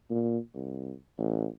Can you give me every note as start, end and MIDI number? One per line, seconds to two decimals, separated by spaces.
0.10 0.38 46
0.55 0.93 36
1.18 1.46 33